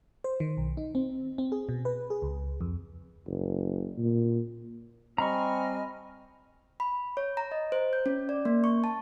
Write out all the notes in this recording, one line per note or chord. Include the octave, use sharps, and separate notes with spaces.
C5
D#3
B1
D#4
C4
C4
G#4
B2
B4
G#4
C#2
F2
F#1
A#2
G3 C4 D#5 G#5 A#5 B5 C#6 F6
B5
C#5
A#5
D#5
C5
G6
C#4
D5
A#3
C#6
A5